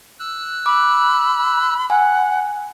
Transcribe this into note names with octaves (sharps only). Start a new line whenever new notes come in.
E6 F#6
B5 D6
F#5 G#5